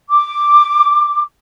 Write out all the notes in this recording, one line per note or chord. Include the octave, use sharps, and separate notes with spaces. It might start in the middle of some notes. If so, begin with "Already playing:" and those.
D6